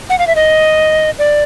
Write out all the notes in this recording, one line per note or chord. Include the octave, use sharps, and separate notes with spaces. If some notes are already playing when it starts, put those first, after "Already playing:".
F#5
F5
E5
D#5
D5